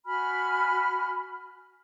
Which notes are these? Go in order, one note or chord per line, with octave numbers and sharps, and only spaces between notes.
F#4 G#5 B5 F6